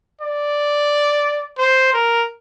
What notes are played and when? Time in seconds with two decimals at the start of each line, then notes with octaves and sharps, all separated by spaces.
0.21 D5
1.58 C5
1.94 A#4